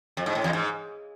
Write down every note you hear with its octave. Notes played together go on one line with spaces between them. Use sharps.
F2
G#2
A2
E2
G#2